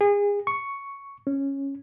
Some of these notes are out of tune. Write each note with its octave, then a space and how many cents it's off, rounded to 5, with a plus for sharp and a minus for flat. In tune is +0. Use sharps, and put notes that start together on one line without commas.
G#4 -30
C#6 +5
C#4 -10